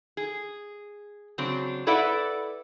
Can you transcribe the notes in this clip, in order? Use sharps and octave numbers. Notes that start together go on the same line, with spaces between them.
G#4
C#3 F#3 C4 D4
E4 A4 B4 D5 E5 F#5